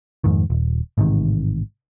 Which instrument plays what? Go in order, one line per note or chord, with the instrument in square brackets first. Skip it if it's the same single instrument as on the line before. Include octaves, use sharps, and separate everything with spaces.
[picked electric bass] F2 G#2 D#3
D#1
A1 G#2 C3 D#3